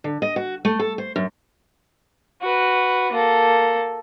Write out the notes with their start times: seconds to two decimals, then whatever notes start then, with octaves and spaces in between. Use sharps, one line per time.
0.04 D3
0.22 D#5
0.36 F#4
0.65 A3
0.79 A4
0.98 C5
1.16 F#2
2.42 F#4 B4
3.12 A#3 A4